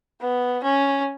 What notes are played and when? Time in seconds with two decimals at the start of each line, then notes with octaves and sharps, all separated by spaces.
0.21 B3
0.63 C#4